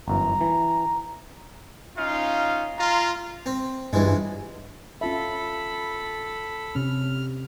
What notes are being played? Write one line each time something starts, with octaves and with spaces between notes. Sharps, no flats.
G1 F#2 E3 A#5
E3
C#4 D#4 F4 F5
F4 A#5
C4
C#2 G2 E3 G#3
C#4 F4 A4 E5 B5
C3 C#4 F6